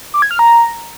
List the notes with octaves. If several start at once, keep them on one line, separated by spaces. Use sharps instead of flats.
D6
G#6
F6
A#5